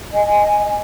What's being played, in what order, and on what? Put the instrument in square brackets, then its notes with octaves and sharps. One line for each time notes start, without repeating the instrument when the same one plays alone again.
[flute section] D#5 G#5